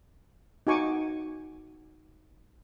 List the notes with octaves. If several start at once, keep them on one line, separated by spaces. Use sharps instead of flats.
D#4 F#4 G#5 C#6 D6